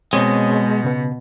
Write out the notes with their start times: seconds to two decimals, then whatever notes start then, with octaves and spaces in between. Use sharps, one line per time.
0.13 B2 G#3 C4 C#5
0.84 C#3 B3